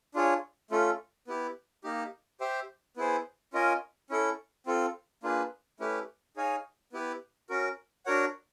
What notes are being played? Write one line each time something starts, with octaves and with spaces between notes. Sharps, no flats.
D4 F4 G#4 C#5
A3 C#4 F4 A4
B3 E4 G4
A#3 D#4 G4
G4 C5 E5 G5
B3 E4 G#4 C5
C#4 F4 A#4 D#5 G#5
C#4 E4 A4
C4 F4 A4
A#3 D4 F4 G#4 B4
A3 C#4 E4 G4 B4
D#4 G#4 C#5 F5 G#5
B3 E4 G4 B4
C#4 F#4 A#4
D4 F#4 A#4 C#5 F#5